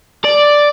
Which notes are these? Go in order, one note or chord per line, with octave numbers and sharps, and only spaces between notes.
D5